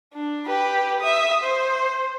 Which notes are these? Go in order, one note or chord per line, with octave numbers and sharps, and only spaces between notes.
D4
G4 B4
E5 D#6
C5